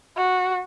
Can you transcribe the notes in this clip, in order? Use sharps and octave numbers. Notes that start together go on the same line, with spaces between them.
F#4